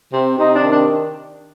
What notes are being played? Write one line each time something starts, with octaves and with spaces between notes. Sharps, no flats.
C3
C3 D#4
D4
D#3
D4